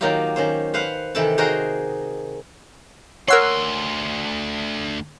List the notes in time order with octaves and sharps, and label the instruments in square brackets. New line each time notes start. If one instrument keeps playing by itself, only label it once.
[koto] D#3 F#3 A#3 D#4 F4 G4
D#3 C#4 C5
B4 C5 F5 F#5
C3 D#3 E3 A4 G5 A5
D#4 F#4 G#4 A#4 C5 D#5
[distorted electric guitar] D2 C6 [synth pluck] A#4 E6 C7 [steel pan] C#5 F#5